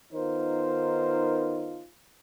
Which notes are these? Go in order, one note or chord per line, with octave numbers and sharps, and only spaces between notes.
D#3 B3 D#4 F4 A#4 C5